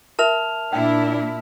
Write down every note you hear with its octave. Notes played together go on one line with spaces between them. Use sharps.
A#4 E5 A5 F6 F7
A#2 D4 E4 G5